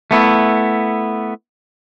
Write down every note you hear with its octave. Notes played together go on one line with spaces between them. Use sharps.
A3 B3 E4